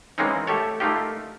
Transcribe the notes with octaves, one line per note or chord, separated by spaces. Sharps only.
E3 G#3 A#3 C4 C#4 D#4
A3 G4 A4 C#5
A3 A#3 D#4 F4 G4